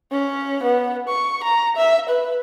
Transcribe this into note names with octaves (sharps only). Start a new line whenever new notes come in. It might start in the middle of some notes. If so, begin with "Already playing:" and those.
C#4
B3
C#6
A#5
E5
B4